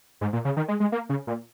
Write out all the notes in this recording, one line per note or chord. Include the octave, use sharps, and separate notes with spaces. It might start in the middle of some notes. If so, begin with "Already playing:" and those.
G#2
A#2
C#3
D#3
G#3
G#3
A#3
C#3
A#2